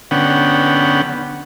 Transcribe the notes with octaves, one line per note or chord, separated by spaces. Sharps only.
D3 B3 C#4 F#5 G5